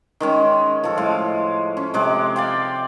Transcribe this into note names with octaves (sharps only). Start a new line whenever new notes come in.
D#3 G#3 C#4
F3 A4
A2 G#3 F5
C#4
C3 G#3 D6
D5 F5 G5